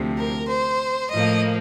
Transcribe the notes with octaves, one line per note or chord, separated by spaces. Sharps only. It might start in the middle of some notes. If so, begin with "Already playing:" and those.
Already playing: D2 C3 F3
A#4
C5
A2 F3 A#3 D#5